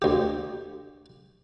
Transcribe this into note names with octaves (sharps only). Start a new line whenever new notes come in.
D2 G4